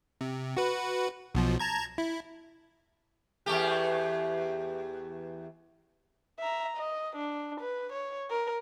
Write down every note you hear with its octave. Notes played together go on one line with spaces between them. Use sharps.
C3
F#4 B4
B1 B2 F3
A5 A#5 G#6
E4
E2 A3 G4
E5 A#5
D#5
D4
B4
C#5
A#4